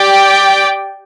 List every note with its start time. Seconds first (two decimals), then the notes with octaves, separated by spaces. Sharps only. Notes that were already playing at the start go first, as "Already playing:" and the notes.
Already playing: G4 D5 G5